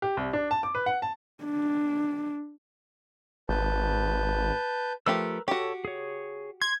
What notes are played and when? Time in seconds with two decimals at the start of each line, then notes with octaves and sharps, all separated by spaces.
0.02 G4
0.17 C2
0.33 D4
0.51 A5
0.63 D6
0.75 B4
0.86 F#5
1.02 A5
1.44 D4
3.49 G#1 B4 A5 G6
5.06 F3 A3 G4 A#4 B4 E6
5.48 F#4 G4 A4 C#5
5.85 G#4 C#5
6.62 C6 G#6